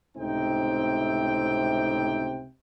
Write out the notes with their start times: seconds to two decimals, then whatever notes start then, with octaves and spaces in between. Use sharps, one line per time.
0.17 C#2 A2 C3 C4 D#4 G5